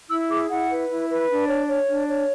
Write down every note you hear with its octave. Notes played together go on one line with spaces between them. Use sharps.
E4 E6
G#4 D6
E4 F#5
B4
E4
B4
D4
C#5
C#5
D4
C#5